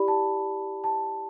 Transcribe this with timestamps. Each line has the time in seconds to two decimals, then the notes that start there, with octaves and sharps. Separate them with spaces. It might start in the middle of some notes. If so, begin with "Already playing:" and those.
Already playing: E4 G4 D5 B5
0.08 A5
0.84 A5